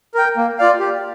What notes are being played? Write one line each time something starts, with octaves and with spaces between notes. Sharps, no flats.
A#4 G5
A#3
F4 D5 F5
G4